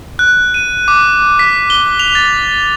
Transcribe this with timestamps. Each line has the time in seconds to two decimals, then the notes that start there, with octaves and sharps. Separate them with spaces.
0.19 F#6
0.54 D#7
0.88 D6
1.39 B6
1.70 G7
2.00 F7
2.15 A6